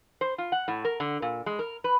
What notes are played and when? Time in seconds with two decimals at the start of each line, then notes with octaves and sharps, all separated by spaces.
0.21 C5
0.38 F4
0.52 F#5
0.68 A2
0.85 A#4
1.00 D3
1.22 A#2
1.46 G#3
1.59 A#4
1.84 B4